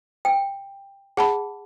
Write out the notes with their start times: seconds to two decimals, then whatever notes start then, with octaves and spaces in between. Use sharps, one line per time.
0.25 G5
1.17 G#4 F#5 A5 B5